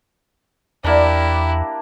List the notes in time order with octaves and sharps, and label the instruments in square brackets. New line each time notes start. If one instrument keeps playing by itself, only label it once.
[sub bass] E2 [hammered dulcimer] A#3 D4 [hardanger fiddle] E4 G4